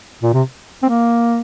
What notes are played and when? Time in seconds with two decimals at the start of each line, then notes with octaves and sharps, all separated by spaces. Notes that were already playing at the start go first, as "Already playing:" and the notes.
0.23 A#2
0.33 C3
0.83 C4
0.89 A#3